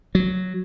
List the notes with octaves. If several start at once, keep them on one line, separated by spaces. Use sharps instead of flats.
F#3